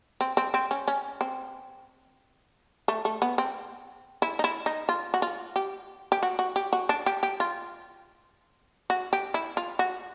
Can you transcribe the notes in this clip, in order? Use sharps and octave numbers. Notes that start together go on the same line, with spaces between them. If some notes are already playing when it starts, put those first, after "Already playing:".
C4
C4
C4
C#4
C#4
C4
A3
A3
B3
C4
E4
D#4
E4
D#4
F4
F#4
F4
G4
G4
F#4
F#4
G4
F#4
D4
G4
G4
F4
F#4
G4
E4
F4
F#4